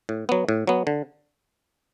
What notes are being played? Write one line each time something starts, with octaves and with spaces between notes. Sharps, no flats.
A2
F#3 B3
A2
F#3 B3
D3